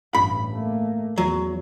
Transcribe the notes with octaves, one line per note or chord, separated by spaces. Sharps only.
A1 G2 B5
A3 A#3
E2 F#3